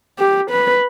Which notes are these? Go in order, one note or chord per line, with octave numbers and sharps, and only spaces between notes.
G4
B4